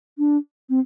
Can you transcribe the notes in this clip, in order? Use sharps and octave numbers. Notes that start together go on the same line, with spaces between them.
D4
C4